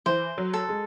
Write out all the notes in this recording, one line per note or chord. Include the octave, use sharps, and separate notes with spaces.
E3 C5
F#3
A4
G#3